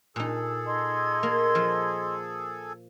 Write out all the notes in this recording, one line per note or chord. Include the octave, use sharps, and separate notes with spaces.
A#2 D#4 G#4 A4
D#5 C6 G#6
A#3
F3